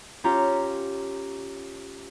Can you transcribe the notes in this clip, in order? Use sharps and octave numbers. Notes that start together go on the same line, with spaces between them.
C#4 F4 G4 A#5